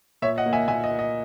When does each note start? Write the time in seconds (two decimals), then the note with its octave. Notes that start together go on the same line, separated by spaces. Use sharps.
0.22 A#2 C#5 E5
0.38 D#5 F#5
0.46 A#3
0.53 E5 G#5
0.68 A#2 E5 G#5
0.84 D#5
0.91 A#3
0.99 D#5